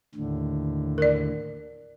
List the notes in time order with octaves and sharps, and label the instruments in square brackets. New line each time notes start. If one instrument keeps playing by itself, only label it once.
[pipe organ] D#2 A2 D3
[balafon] A#4 D5